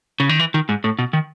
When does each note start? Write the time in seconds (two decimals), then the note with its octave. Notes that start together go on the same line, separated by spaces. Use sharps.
0.20 C#3
0.29 D#3
0.39 E3
0.54 D#3
0.69 G#2
0.84 A2
0.99 B2
1.13 D#3